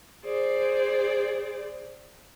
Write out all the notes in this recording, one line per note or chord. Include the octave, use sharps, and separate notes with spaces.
G#4 C5 D5